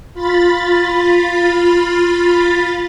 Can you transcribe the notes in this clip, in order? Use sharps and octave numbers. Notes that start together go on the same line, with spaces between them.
F4 B5 A6